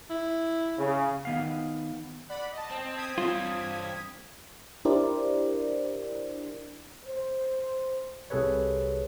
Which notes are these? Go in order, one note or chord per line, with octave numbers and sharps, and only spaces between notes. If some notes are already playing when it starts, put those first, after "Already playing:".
E4
C#3
D#3 B3 F5
D5 F#5 B5
D#5 A5
C4
D#6 G#6 B6
G2 C4 F4
D4 E4 G4 A#4 C5 D5
C5
C2 C3 G#4 A4 B4 C#5